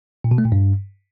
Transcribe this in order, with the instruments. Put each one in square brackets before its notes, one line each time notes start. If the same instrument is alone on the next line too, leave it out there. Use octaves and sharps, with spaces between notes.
[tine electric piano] A#2
B2
A3
A#2
G2